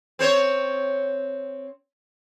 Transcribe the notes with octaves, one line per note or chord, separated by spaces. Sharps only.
C4 C5 C#5